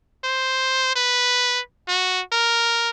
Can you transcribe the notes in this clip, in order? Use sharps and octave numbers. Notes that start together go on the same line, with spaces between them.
C5
B4
F#4
A#4